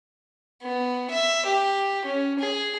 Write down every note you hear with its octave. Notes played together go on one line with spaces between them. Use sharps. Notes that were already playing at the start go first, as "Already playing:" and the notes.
B3
E5
G4
C#4
G#4